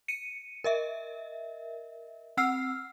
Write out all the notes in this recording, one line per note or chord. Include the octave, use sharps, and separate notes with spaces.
C#7 D#7
A#4 D#5 E5
C4 F#5 E6 F6 C7